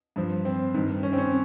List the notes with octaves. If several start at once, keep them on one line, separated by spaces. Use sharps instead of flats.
G2 F3
C4
G2 D#3
C#4
C4
C#4